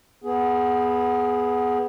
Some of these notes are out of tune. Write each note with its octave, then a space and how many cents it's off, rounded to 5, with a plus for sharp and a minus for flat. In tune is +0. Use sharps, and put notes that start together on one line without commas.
B3 +0 G#4 +10